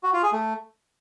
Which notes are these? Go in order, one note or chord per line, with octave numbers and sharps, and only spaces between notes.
F#4
F4
G#4
A3